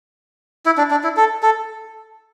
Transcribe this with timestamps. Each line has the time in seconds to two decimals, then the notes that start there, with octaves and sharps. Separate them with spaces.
0.66 E4
0.78 D4
0.91 D4
1.04 E4
1.17 A4
1.43 A4